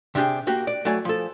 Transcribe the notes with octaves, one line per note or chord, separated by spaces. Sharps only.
C3 D4 F4 G4 G#4
A#3 F#4 G4
D5
F#3 A3 D5 G#5
F3 A4